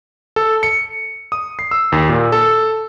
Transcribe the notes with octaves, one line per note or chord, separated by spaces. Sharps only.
A4
C#7
D#6
C7
E6
D#2
A#2
A4